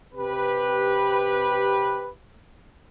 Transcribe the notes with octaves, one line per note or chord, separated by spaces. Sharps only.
C3 G4 B4